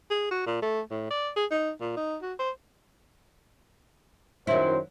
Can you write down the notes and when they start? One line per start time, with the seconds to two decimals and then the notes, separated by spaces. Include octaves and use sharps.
0.10 G#4
0.31 F#4
0.46 A#2
0.62 A3
0.91 A2
1.10 D5
1.36 G#4
1.51 D#4
1.80 A#2
1.96 D#4
2.22 F#4
2.39 C5
4.47 F#2 D#3 F#3 E4 C5